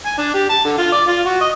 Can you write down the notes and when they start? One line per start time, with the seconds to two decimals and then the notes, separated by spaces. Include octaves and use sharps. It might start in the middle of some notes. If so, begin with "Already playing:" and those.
0.06 G#5
0.18 D4
0.34 G4
0.49 A5
0.65 D3
0.78 F4
0.92 D5
1.08 F4
1.25 F#4
1.41 D#5